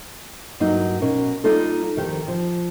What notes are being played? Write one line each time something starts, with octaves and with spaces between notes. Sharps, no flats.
G2 F#3 A#3 D#4
B2 C#4 A#4
G3 A#3 D#4 F4 A4
F2 D#3 G4
F3